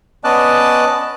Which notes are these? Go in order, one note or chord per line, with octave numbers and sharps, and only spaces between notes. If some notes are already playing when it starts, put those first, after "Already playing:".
B3 C#4 D5 D#5 A5 F#6